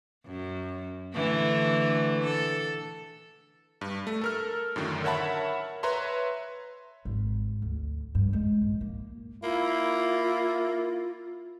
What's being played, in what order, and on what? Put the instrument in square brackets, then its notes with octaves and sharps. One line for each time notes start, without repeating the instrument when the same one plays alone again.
[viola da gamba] F#2
D3 E3 A3
A4
[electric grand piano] G2
A3
A4 A#4 F6
F#2 A2 D3 D#3
A#4 C#5 E5 F#5 A5 B5
B4 C#5 E5 A#5 C6
[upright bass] G#1
D2
G2
G#3
A#1
A#3
[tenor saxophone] A#3 [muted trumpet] E4 [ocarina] F4